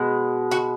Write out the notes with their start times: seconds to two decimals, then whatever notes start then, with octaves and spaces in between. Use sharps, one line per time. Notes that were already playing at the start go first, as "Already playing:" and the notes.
Already playing: B2 G#3
0.51 F#4